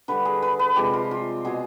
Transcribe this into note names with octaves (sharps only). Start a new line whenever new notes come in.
D3 G3 B4
G#4
B4
B4
C3 F3 G#3 G4
F4
F4
B2 G#3 G#4